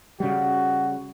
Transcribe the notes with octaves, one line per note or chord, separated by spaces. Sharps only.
C#3 G3 F#4